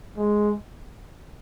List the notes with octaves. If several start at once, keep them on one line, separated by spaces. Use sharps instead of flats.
G#3